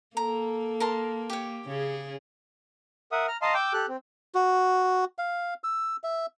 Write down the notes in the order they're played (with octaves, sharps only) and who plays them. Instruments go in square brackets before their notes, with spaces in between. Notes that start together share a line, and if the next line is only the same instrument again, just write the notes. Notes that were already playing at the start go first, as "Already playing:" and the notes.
[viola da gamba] A#3 [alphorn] A4 [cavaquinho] A#5
[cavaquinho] A#4 A5 C6
G4 C#5
[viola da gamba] C#3 C#4 G#4
[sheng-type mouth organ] A#4 E5 F#5 D#6
A#5 F6
D#5 F5 A5 A#5 C6
G5 D6 E6 G6
G4 A4 F#6
C4
[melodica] F#4
F5
E6
E5